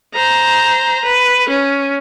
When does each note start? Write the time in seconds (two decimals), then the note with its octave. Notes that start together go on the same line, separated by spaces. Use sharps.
0.14 C5 A#5
1.05 B4
1.49 C#4